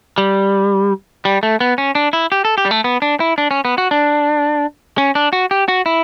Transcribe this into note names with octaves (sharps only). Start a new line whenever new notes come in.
G3
G3
A3
B3
C#4
D4
E4
G4
A4
G4
G3
A3
B3
D4
E4
D4
C#4
B3
F#4
D4
C#4
D4
F#4
G4
F#4
E4